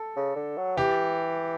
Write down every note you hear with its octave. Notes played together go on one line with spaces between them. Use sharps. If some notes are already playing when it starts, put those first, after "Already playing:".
Already playing: A4
C#3
D3
F#3
E3 G4